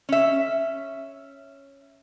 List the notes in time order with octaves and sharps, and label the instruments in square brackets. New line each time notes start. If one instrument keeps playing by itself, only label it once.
[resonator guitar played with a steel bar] C#4 E5